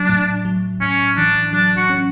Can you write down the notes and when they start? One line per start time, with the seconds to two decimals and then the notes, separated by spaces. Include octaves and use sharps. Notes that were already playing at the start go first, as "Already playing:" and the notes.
Already playing: F#3 D4
0.09 A2
0.45 F#3
0.81 A2 C#4
1.17 E3 D4
1.53 F#3 D4
1.77 F#4
1.90 C#4